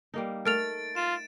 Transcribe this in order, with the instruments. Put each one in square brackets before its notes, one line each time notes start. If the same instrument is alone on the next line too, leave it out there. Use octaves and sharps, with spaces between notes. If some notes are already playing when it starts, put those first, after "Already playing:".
[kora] G3 A#3 D#4
[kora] A3 [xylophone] A#4 F6 F7 [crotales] A6 D7
[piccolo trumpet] F4 [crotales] E7